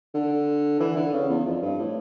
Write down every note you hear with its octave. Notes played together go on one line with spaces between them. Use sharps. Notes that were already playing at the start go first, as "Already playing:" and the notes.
D3
E3
D3
C#3
E2
F2
G2
A2